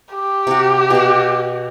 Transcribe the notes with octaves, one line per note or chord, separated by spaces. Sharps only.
G4
C3 F#4
B2 F5